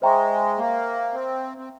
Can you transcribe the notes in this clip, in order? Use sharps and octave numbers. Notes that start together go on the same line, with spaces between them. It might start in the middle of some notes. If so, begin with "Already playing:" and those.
G#3 C5 E5 G5 A#5 C#6
A#3
C4
C4